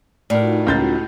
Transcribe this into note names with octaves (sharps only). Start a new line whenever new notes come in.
A2 D#4 F4 F#4 A#4 D5
C#2 A#3 G6 A6